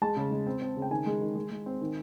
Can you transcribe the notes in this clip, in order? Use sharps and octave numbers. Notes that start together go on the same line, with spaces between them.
G#3 A5
C#3
G#3
C4
C4
C#3
G5
D#3 G#5
G#3
D#3
G#3
G#3
C4
D#3